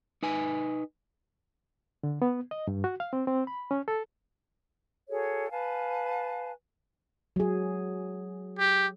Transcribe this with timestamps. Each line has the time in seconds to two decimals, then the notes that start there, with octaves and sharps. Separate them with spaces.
0.23 D#4 B4 G#5
2.03 D3
2.22 B3
2.51 D#5
2.67 G2
2.84 F#4
3.00 F5
3.13 C4
3.27 C4
3.47 B5
3.71 C#4
3.88 A4
5.10 F#4 G#4 A4 C#5
5.51 B4 F5 G#5 A5
7.36 F#3 G#4
8.59 G4